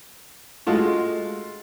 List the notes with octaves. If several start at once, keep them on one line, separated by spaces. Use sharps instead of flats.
G#3 A3 F4 F#4